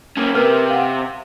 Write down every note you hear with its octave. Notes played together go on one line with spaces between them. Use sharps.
A#3 C#4
C3 A#4 B4 F6
F5 F#5